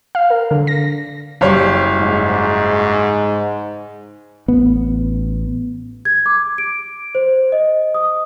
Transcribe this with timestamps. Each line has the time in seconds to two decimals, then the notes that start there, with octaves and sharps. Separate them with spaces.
0.15 F5
0.30 A#4
0.51 D3
0.67 A#6
1.41 F#1 G3 C#5
1.99 G#2
4.48 A1 B3
6.05 G#6
6.26 D6
6.58 D7
7.15 C5
7.52 D#5
7.94 D#6